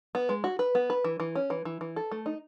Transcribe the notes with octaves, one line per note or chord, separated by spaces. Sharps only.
B3
G#3
F#4
B4
B3
B4
E3
E3
C#4
E3
E3
E3
A4
A3
D#4